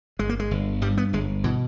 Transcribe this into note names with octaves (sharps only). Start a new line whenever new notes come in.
G1 G#3
A#3
G#3
G1
G2 G3
B3
G1 G#3
B2 E3